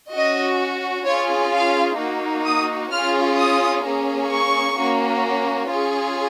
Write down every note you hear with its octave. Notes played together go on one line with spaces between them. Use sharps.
C#4 F#4 D#5
C#4 F4 G#4 C#5
F5
A#3 D#4 F#4
D#6
C#4 F4 G#4 F6
D#6
A#3 C#4 G#4
C#6
A#3 C#4 F#4
C#4 F4 G#4